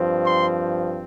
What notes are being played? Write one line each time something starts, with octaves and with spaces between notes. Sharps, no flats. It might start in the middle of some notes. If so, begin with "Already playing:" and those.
Already playing: G2 F3 C4
C6